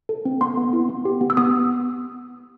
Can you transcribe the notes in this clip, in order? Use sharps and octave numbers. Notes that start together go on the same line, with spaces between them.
A4
C4
B3 C6
B3
E4
B3
G4
B3
E6
B3 D#6